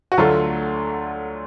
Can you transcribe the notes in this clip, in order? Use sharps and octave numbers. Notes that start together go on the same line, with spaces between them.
F#4
D2 D3 F#3 A3 F4